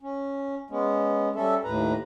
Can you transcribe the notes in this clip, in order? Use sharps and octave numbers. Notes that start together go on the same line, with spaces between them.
C#4
G#3 B3 C#4
G3 C#4 A4 E5
D#2 A2 B4 A#5